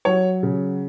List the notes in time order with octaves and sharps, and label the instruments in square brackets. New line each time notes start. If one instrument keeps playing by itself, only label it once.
[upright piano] F#3 C#5
C#3